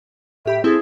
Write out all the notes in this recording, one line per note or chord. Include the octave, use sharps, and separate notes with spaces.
A2 G4 E5 B5
C4 E4 G#4 A4